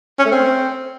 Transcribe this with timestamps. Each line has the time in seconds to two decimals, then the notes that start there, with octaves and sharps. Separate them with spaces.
0.19 C#4
0.25 A3
0.32 C4